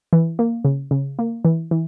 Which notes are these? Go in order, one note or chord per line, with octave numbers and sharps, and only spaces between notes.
E3
A#3
C#3
C#3
A#3
E3
E3